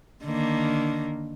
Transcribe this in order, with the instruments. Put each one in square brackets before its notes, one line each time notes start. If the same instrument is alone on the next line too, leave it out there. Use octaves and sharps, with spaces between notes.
[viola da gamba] D3 D#3 A#3